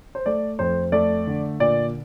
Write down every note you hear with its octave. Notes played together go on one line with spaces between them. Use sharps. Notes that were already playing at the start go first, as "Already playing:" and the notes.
C5
A3 D5
F2 C5
A3 D5
D3
A#2 D5